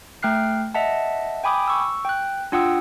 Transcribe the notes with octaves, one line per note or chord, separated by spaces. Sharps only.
A3 G5 F6 F#6 C7
D#5 E5 F#5 A5
G5 G#5 B5 D6 D#6
C#6 E6
G5 F#6
D4 F4 F#5 G5 D#6 E6